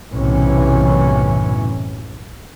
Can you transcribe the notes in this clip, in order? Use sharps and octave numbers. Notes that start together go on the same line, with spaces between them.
B1 F#2 A2 C3 E3 C#4